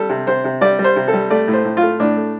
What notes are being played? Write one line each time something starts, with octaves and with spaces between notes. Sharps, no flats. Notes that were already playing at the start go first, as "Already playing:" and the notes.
Already playing: G3 A4
C3
C3 C5
C3
G3 D5
G3
C5
C3
A4
G3
A3 D5
A2
C5
A2
F4
A3
A2 D4
A3